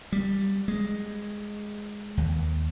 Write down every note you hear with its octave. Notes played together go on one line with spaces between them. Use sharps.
G3
G#3
D#2